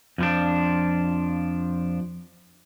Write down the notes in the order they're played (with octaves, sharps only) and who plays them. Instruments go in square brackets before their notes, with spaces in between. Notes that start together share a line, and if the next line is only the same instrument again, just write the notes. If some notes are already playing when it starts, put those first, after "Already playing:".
[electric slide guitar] F2 F3 D4